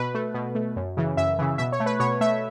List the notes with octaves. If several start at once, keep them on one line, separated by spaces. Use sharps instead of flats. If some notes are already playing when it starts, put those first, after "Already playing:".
Already playing: B2 B4
A3
B2
A3
F#2
C#3 E3
F#2 E5
C#3 E3
B2 E5
C#5
A3
B4
B2 C#5
A3 E5